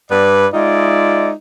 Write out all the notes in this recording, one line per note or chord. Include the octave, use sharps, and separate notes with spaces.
G2 B4 D5
G#3 D#4 F4 D5 E5